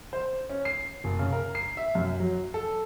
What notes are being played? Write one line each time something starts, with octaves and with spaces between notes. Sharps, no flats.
C5
C#4
C7
F#1
C#3
A#4
C7
E5
F#2
F#3
A4